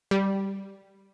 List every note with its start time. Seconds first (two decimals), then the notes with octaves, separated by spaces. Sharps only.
0.11 G3